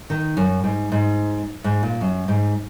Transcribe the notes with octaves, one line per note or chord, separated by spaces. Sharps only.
D#3
F#2
G#2
G#2
G#2
A#2
F#2
G#2